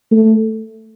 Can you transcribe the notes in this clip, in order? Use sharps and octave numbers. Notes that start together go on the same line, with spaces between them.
A3